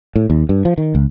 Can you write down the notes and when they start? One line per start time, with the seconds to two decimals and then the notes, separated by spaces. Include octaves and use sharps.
0.16 A2
0.30 D#2
0.49 G2
0.65 F3
0.78 D#3
0.95 C#2